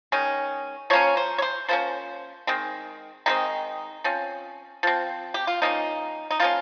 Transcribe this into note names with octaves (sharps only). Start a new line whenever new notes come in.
D#3 G#3 C#4
F3 A#3 C#4 C#5
C5
C#5
C5
F3 A#3 C#4 C5
D#3 G#3 C4
D#3 G#3 C4 D#4
F3 C4 C#4
F3 C4
G4
F4
F3 A#3 C#4 D#4
D#4
F3 A#3 C#4 F4